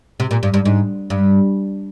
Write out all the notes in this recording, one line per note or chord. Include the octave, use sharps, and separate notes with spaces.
C3
A#2
G2
G2
G#2
G2